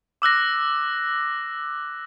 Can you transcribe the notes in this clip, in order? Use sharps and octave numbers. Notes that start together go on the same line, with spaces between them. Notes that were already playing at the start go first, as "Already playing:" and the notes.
D6 E6 F#6 A#6